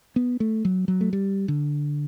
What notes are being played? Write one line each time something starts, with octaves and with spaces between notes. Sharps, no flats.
B3
A3
F#3
F#3
A3
G3
D3